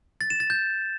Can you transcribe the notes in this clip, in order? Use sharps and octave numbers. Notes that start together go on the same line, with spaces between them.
A6
E7
A6
G6